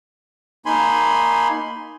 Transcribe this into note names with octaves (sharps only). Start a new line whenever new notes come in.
A#3 D#4 G#5 B5 C6